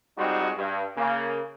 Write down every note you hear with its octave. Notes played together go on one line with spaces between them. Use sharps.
G3 G#3 C4 D#4 F4 F#4
G2
C#3 A#3